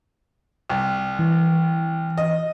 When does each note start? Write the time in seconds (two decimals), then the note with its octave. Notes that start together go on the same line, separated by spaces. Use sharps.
0.69 C2
1.19 E3
2.18 D#5